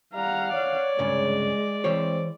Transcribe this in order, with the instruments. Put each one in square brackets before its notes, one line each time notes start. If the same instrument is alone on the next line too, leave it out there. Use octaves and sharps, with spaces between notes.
[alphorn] G3 [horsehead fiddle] F5 F#5 [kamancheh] A#5
[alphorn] C#5 [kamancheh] D5
[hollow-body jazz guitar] C2 G2 C#3 [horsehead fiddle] G#3
[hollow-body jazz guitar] E3 C5 C#5 [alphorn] C4